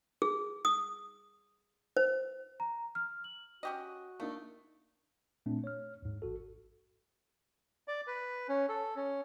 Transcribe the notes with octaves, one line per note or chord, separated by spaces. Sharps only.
G#4
D#6
C5
A#5
F6
F#7
C#4 F#4 G4 D#5
A3 A#3 D4 D#4
A#2 A3 C4 D4
C#5 F6
D#2 G#2
A1 F#4 A4
D5
B4
C#4
A4
C#4